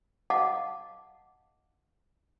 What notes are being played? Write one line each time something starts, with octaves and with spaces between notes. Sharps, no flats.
D#5 F5 F#5 A5 D6